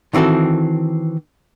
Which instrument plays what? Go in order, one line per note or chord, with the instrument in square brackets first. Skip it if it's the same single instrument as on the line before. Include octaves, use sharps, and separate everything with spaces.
[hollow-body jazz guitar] D#3 E3 C4 F#4 A4